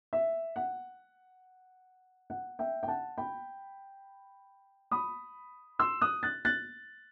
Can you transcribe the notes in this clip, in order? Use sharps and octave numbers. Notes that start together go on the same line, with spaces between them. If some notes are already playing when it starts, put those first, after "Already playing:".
E5
F#5
F#5
E5 G5
G5
F#5 A5
G5 B5
B5 D#6
C6 E6
D#6 F#6
F#6 A6
F#6 A6